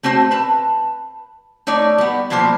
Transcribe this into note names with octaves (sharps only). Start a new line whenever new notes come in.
A3 C4 F#4 C5 A5
B4 A5
A3 D#4 C#5 D5
G3 B3
B2 E3 F3 G3 A#3 C5